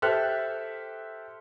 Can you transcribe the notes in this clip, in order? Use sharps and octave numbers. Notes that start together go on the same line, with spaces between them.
G4 A4 C5 E5 F6 F#6